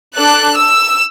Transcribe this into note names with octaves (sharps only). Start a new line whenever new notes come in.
D4 A4 F#6
E6